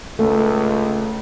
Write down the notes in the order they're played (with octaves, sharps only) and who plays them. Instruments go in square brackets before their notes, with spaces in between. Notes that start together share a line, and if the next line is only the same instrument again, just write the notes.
[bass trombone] C#2 [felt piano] A3